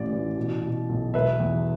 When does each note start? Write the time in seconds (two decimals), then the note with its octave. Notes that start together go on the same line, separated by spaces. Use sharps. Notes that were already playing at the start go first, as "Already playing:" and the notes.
Already playing: A1 A2 D5
0.12 E3
0.37 B2
0.62 B2
0.89 B1
1.14 E1 B4 E5
1.40 E2